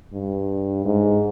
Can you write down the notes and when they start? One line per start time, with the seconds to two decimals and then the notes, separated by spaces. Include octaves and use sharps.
0.13 G2
0.85 G#2